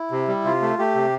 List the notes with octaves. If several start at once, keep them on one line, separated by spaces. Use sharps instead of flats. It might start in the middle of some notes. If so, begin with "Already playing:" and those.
Already playing: E4
C3
G3
C3 F4
A3
A3 G4
C3